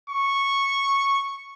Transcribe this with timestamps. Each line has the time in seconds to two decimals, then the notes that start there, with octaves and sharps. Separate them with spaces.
0.10 C#6